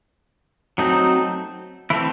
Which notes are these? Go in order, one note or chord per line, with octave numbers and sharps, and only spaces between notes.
F#3 A3 C4 D#4
E3 A3 C4 E4